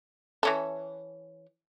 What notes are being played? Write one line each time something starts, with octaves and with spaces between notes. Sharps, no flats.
E3 C#4 A4